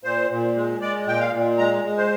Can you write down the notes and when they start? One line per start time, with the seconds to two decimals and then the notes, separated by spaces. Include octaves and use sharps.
0.04 A#2 C5
0.30 A#2
0.56 G#3
0.81 G#3 D5
1.07 A#2 G5
1.19 F5
1.33 A#2
1.58 G#3 A#5
1.85 G#3
1.97 C5